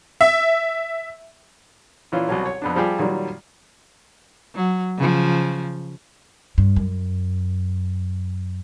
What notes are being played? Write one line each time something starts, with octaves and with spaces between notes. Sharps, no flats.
E5
A#2 E3 C#4 F4
C2 B2 F#3
C#5
F2 B3 D4
F3 G3 F4 G4 G#4
A#2 D#3 F#3 G3
F#3
C#3 F3
G2
F#2